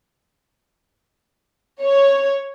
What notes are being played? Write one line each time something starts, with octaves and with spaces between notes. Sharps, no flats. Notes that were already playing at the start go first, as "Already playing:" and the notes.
C#5